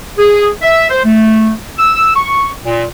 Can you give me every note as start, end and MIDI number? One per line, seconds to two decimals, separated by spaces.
0.18 0.48 68
0.62 0.86 76
0.90 1.02 72
1.04 1.50 57
1.78 2.15 88
2.15 2.48 85
2.65 2.84 46